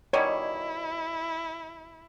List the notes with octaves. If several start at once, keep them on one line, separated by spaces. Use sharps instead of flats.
B2 D#3 G3 E4 C#5